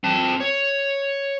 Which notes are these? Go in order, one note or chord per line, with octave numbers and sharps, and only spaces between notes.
C4 A5
C#5